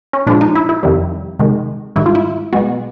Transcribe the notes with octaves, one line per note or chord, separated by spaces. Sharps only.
C#4
A#2 F3 G#3 D4
D#4
E4
E4
F2 C3 D#3 G3
C3 D#3 G#3
G#2 D#3 G3 E4
F4
E4
B2 G#3 B3 F#4